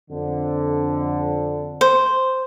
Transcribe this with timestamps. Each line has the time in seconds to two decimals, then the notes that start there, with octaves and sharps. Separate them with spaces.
0.11 F2 D3
1.81 C5